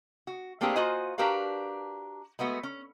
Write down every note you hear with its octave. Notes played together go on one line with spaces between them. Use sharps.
F#4
A3 A#3 C4 D4 G4 G#4
A#3 F4 F#4 C5 D#5 G#5
D4 F#4 G4 A#4 B4 F5
G#3 A3 B3 F#4
C#4